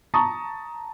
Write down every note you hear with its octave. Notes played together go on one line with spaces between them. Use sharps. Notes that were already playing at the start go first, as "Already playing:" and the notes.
A5 A#5 C#6 D#6